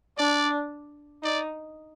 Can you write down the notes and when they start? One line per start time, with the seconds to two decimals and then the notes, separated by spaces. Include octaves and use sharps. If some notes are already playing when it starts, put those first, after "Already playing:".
0.18 D4 D5
1.24 D#4 D5